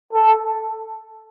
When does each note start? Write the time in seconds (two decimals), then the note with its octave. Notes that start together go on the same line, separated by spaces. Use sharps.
0.13 A4